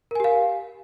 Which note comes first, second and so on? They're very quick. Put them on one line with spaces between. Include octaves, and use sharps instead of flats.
A#4 G#5 G4 F5